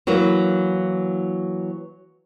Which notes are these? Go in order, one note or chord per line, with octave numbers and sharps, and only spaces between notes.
E3 F#3 A#3 A#4